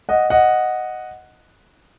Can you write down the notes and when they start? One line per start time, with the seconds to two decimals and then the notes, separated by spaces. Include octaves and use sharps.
0.09 D#5 F#5
0.30 D#5 F#5